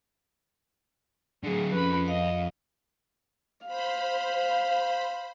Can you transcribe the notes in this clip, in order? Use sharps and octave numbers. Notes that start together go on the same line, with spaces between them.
D3 F#3 G#4
F2 C#4 B4 B5
D#5 F5
C5 F5 B5